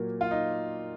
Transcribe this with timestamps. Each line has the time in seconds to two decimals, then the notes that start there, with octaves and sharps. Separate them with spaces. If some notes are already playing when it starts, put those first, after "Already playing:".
Already playing: A#2 F#3 A#3
0.21 F4
0.31 D#4